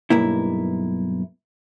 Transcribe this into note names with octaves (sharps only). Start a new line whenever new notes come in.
B1 G2 A#3 E4